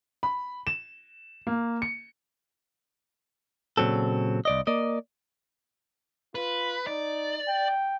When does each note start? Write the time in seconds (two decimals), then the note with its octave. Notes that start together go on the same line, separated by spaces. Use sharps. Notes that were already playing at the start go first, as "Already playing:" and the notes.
0.23 B5
0.67 E7
1.47 A#3
1.82 C#7
3.77 A#2 C#3 F#3 C4 A4
4.45 C2 D5 D#5
4.67 A#3 D5 D#5
6.35 F4 B4
6.87 D#4 D5
7.48 G5